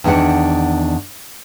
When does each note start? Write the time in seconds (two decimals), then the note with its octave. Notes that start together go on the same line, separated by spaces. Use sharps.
0.04 E2 D#3 F3 D4 F#5